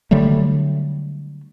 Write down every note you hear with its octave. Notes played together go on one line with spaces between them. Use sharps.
D3 F#3 G3 A3